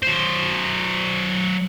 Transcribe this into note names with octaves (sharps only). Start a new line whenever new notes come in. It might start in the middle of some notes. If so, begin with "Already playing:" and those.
F#3 C5